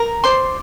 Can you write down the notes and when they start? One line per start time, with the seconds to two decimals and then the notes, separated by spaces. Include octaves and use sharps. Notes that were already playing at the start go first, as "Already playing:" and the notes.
Already playing: A#4 A#5
0.24 C5 D5 C6